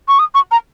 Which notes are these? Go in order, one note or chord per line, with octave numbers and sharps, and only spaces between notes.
C#6
D#6
C#6
A#5